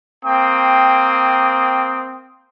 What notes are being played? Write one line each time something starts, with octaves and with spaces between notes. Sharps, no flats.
A#3 C4 G5 D#6